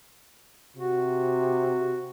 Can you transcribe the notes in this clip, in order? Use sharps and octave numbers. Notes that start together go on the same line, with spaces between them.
C3 F#4